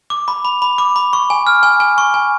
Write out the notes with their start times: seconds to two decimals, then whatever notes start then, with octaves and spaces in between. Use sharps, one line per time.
0.10 D6
0.28 B5
0.45 B5
0.62 B5
0.78 D6
0.96 B5
1.13 C#6
1.30 G#5
1.47 F6
1.63 G#5
1.80 G#5
1.98 C#6
2.14 G#5